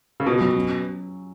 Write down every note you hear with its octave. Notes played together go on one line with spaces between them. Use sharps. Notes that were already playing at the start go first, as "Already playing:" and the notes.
C#3
B2 F4
F#3
C#4